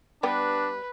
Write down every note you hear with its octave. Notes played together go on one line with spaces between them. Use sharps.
G3 B3 D4 G4 B4